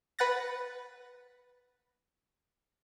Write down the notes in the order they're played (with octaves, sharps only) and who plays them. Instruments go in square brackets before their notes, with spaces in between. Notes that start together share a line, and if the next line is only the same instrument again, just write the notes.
[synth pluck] B4 F#5 F#6 A6 A#6